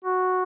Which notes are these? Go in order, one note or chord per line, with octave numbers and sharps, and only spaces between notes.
F#4